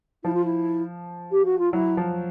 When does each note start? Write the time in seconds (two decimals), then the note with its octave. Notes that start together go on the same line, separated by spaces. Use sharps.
0.24 F3 E4
0.34 F4
0.45 E4
1.32 G4
1.45 F#4
1.59 F4
1.73 F#3 E4
1.97 F3